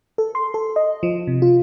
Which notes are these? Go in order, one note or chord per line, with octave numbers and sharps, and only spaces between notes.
A4
C6
A4
D#5
F3
C3
F4